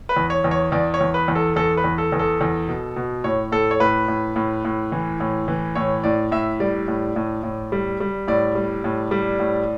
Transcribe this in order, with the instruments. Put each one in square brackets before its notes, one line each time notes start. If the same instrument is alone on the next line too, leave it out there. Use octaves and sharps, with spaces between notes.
[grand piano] B4
E2
C#5
E2
C#5
E2 D5
C#5
E2
B4
E2
A4
E2 A4
B4
E2
A4
E2
A4
E2
B2
B2
A2 C#5
A2 A4
C#5
A2 B4
A2
A2
A2
E3
A2
E3
A2 C#5
A2 D5
A2 E5
G3 D5
A2
A2
A2
G3
G3
A2 D5
G3
A2
G3
A2